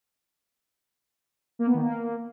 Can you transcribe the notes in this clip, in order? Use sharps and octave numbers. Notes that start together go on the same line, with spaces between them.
A#3
B3
D#3
A#3